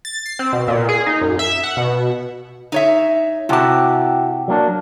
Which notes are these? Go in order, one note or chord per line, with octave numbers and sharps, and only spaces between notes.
A6
C7
C4
B2
A#2
G#4
D#4
F#2
E5
F#5
B2
D#4 C#5 E5
C3 E4 F#4 G4 A5
F#3 A#3 D4